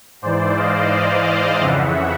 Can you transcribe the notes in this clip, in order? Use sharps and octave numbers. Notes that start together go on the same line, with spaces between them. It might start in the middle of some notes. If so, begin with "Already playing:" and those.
G#2 E3 C5 D5
D#5 F5
C5 D5
D#5 F5
F2 C#3 E3 E5 F#5